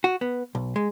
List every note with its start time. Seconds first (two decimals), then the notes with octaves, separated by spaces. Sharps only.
0.04 F#4
0.21 B3
0.55 B1
0.76 G#3